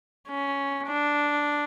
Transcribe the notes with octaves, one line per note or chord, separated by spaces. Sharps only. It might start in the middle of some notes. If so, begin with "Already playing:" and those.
C#4
D4